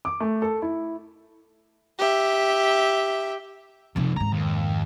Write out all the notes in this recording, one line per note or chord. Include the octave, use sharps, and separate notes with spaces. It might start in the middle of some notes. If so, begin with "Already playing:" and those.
D6
A3
A4
E4
G4 E5
F2 C3 F3 D#4
F2 G#2 A#5
D#2